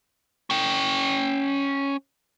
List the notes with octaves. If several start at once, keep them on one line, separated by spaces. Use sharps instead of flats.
C#4 G5